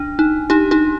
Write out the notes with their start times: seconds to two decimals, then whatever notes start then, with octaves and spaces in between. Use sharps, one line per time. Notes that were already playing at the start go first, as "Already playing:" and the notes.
Already playing: D4
0.19 D#4
0.50 D#4 G4
0.71 D#4 G4